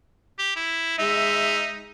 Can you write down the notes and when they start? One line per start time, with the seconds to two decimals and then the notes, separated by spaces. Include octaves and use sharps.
0.39 G4
0.56 E4
0.99 G#3 D#4 E5